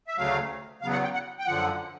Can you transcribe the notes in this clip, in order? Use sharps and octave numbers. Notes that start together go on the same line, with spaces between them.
E5
D2 C#3 F#3 A3 F5
E2 C#3 F#3 B3 F5
F#5
G5
F#5
G5
F#2 D3 F3 F#5